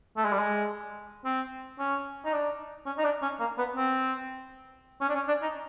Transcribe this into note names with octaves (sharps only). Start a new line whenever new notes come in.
A3
G#3
G3
G#3
C4
C#4
D#4
D4
C#4
D#4
D4
C#4
A#3
B3
C4
C#4
D4
C#4
D4
D#4